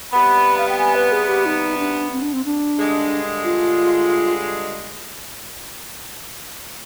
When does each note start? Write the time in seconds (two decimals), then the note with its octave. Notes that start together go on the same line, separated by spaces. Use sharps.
0.12 C3 G3 B3 B5
0.58 F5
0.69 G5
0.79 G#5
0.95 B4
1.12 G#4
1.28 G4
1.46 D#4
1.78 D4
2.12 C4
2.22 D4
2.33 C4
2.45 D4
2.78 G2 D3 G#3
3.44 F4